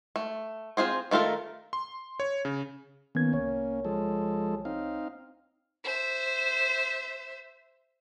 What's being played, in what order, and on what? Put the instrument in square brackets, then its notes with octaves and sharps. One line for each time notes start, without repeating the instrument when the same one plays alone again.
[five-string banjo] A3
C4 F4 G#4 C5
D#3 A3 F4 A4 A#4
[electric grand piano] C6
C#5
C#3
[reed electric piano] D#3 B3 G#6 [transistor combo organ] A#3 C#4
[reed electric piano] C2 C#5
[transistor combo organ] F3 G#3 A4
C4 D#4 F5
[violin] C5 E5